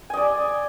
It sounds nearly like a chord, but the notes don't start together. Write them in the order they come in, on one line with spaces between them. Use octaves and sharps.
G#5 D#5 D5